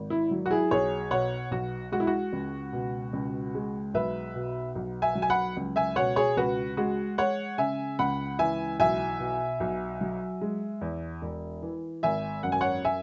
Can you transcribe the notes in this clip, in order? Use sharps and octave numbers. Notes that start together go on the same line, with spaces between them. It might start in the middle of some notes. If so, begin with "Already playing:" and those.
Already playing: G#1
E4
F#3
F#4
E4 G#4
B1 G#4 C#5
B2 C#5 F#5
B1 F#4
G#3 F#4
E4
F#4
C#2
B2
C#2
G#3
B1 B4 E5
B2
B1
E5 G#5
F#3
G#5
F#5 B5
C#2
E5 G#5
B2 C#5 F#5
G#4 C#5
C#2 F#4 B4
G#3 F#4
G#3 C#5 F#5
C#3 E5 G#5
C#2 F#5 B5
E3 E5 G#5
B1 E5 G#5
B2
B1
F#3
G#3
E2
E1
E3
G#1 E5 G#5
F#2 F#5
G#5
C#5 F#5
E5 G#5